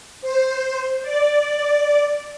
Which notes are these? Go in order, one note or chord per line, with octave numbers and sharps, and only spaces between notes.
C5
D5